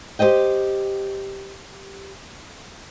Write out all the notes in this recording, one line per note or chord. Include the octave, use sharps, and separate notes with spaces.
G4 G#4 C5 D#5 G5